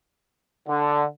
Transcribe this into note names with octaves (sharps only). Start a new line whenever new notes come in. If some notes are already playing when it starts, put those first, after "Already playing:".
D3